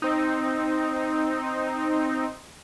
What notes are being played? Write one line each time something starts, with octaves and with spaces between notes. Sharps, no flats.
C4 D#4